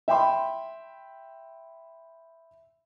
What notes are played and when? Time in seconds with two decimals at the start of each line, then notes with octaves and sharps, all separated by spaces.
0.08 E5 G5 B5 C6